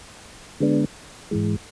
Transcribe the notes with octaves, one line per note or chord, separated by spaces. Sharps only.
D3 G#3 B3 D4
G#2 E3 G#3